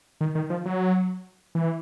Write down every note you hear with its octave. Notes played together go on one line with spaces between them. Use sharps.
D#3
D#3
F3
F#3
E3